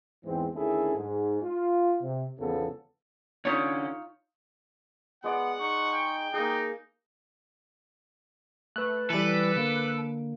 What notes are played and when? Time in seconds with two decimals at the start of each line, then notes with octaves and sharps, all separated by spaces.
0.25 E2 G#2 E3 G#3 C4
0.53 D2 D#3 C#4 E4 G#4 A4
0.95 G#2
1.42 F4
2.01 C3
2.39 G#1 E2 C#3 F3 B3 A4
3.45 D3 C#4 D#4 F4 C#5
5.24 G#3 B3 D5 F#5
5.60 D#4 C#6
5.93 G5
6.34 A#3 D#4 G#4
8.76 A3 B4 F#6
9.10 E3 G3 A4 B4 D6
9.56 D3 A#3